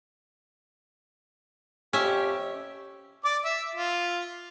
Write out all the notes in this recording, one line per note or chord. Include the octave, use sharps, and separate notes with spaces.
F2 C#4 G4 E5
D5 D6
E5
F4